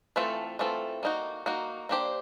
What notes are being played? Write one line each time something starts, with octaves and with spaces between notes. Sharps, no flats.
E3 A3 C4 F4 A4
E3 A3 C4 F4 A4
A#3 D#4 F#4
A#3 D#4 F#4
A#3 D4 G4 C5